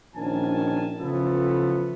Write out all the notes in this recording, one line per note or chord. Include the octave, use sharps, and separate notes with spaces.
A#1 D#3 C#4 A#4 G#5 A5
C#3 E3 F3 A3 B3 A4